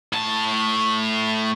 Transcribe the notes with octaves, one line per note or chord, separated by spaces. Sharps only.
A2 A5